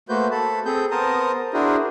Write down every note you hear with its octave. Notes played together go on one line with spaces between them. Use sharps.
A3 A#3 F#4 B4 C5 G6
A4 A5 B5
C4 G#4 A4 G6
B3 A#4 C5 A5 A#5 D#6
D4 E4 F#4 G#4 A#4 C5